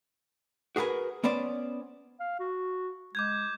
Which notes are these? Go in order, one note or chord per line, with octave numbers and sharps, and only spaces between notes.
F#4 G#4 A#4 B4 G#5
B3 C#4 C5 D5
F5
F#4
G#3 D6 G6 G#6